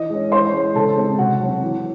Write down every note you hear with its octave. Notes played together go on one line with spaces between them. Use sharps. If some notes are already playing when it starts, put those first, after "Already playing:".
Already playing: E3 D#5
G#3 C#4
E3 C5 C6
G#3 C#4
C#3 A4 A5
G#3 C4
C3 F#4 F#5
F#3 C4
E3